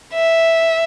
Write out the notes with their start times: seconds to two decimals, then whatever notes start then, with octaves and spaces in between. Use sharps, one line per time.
0.14 E5